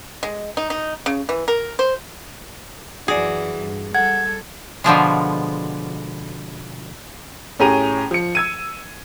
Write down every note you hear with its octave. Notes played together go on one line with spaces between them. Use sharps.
G#3
D#4
D#4
C#3
E3
A#4
C5
F#2 E3 F#4 G#4 D5
G2
G3 A4 F#5 G#6
B2 D3 F3 G#3
A2 C#4 G4 G#4 A#5 D#7
F3 C#7
E6 G#6 D#7